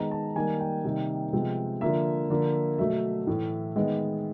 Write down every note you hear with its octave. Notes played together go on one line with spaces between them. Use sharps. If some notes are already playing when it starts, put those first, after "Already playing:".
Already playing: D#3 G#3 B3 A#5
A5
D#3 G3 A#3 G#5
G5
C3 D#3 G3 A#3
C3 F3 G#3 B3
D3 F3 A#3 E5
D3 F3 A#3
B2 F#3 A3 E5
A2 E3 A3
D#3 G#3 B3